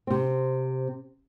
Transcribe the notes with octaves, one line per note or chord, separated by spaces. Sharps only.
C3 C4